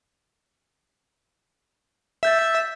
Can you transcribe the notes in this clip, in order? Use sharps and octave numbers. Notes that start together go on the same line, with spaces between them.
E5 E6 G6 A6